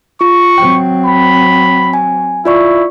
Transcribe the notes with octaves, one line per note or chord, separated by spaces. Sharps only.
F4 C#6
F#3 C4 G5
B5
G#5
E4 F4 D5 C#6